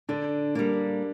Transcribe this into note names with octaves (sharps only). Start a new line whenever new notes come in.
D3 D4
G3 A#3 D4